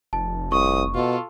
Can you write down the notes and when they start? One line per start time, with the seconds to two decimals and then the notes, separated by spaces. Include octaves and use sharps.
0.13 F1 A5
0.52 C2 C#6 D#6
0.94 B2 F4 A4